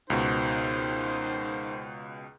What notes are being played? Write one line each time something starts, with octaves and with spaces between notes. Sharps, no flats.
C#2 B2 D#3 C5